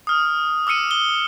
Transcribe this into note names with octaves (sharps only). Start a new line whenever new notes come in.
D#6 F6
D6 E6 F6 C#7 D#7
G7